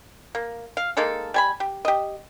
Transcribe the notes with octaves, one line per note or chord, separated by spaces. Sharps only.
A#3
F5
G#3 A#3 D#4 A4
G3 G#5 B5
G4
G4 D#5